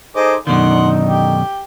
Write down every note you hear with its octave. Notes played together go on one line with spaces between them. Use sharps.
D#4 G#4 A4 C5 D#5 D6
F#2 B2 D3 D#3 D#4 D5 F#5 C6
G4